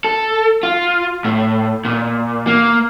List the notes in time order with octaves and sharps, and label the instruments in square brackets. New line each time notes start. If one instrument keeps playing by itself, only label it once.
[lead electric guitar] A4
F4
A2
A#2
A#3